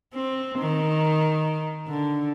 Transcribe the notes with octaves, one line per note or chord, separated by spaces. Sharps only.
C4
D#3
D3